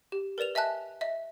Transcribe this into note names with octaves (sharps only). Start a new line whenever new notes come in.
G4
A#4 B4 D5 E7 F7
D#5 E5 G#5 A5 F#6
D#5 E5